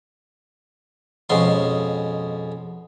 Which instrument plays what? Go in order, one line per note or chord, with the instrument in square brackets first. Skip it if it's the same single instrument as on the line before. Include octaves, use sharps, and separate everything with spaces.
[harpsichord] F2 B2 G#3 C#4 C6